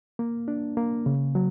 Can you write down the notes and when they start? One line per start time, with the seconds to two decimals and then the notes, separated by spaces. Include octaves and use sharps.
0.19 A#3
0.48 D4
0.77 A#3
1.06 C#3
1.35 F#3